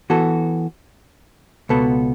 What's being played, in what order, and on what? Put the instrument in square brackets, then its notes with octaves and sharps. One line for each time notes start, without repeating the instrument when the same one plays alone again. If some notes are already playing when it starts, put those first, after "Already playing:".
[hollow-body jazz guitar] E3 B3 F#4 A4
C#2 B2 B3 A4